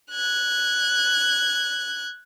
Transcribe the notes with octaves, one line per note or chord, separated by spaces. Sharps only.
F#6 G#6